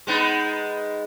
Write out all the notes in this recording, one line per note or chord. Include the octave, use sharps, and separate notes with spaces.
G#3 B3 D#4